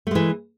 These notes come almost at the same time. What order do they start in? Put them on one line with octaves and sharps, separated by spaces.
A3 G#3 E3